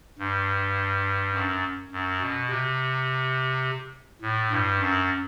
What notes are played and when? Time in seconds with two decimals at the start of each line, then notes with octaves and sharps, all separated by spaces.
0.19 G2
1.34 F#2
1.92 F#2
2.21 B2
2.49 C3
4.22 A2
4.51 G2
4.80 F#2